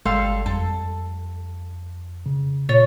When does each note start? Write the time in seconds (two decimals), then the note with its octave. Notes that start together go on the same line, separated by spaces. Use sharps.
0.05 G1 G3 G#3 A4 F5 C6
0.46 F2 A4
2.26 C#3
2.69 A#2 C#5 A6